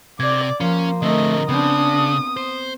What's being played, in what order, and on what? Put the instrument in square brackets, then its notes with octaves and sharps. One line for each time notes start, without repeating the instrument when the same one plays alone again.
[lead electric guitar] C3 [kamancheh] D5 D6 [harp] G#6
[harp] F3 C6 [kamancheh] A#3 [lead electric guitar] C#4
[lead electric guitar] D3 C4 [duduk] A3 [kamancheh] A#4 D#5
[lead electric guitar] C#3 [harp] B3 C4 [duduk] D4 [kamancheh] D#6
[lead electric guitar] C5